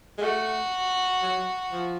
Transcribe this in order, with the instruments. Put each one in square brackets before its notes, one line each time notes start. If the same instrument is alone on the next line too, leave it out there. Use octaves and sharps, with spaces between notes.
[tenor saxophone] G#3
[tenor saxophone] A3 [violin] F#4
[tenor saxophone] F#3
F3